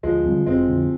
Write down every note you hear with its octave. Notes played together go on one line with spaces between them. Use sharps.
D2 F3 G#3
D3 G3 C4
F1 G#3 C4
F2 D3 F3